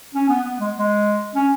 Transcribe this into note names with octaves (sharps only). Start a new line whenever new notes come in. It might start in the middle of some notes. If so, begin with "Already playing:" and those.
C#4
B3
B3
G#3
G#3
C#4